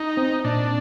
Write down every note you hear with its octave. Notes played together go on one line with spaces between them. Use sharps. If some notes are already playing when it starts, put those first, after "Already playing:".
Already playing: D#4
C4
A#2 D4